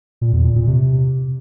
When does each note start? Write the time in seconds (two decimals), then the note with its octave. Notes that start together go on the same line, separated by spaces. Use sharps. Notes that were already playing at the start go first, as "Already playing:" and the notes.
0.21 A#2
0.33 E2
0.44 A#2
0.56 A#2
0.67 C3